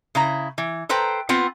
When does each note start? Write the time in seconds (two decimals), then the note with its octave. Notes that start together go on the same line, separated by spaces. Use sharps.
0.15 C#3 E4 A#5
0.58 E3
0.89 A4 B4 C5 G5 A#5
1.29 B3 C4 F4 F#5